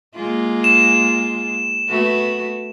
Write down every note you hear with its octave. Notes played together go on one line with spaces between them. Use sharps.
G#3 A#3 F4
E7
A3 B3 F#4